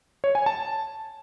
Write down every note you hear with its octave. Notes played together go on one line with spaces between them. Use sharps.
C#5
G#5
A5